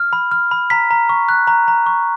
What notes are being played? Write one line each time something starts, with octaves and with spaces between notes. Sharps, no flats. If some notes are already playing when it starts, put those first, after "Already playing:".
Already playing: F6
B5
F6
B5
A#5 B6
A#5
C#6
F#6
A#5
A#5
C#6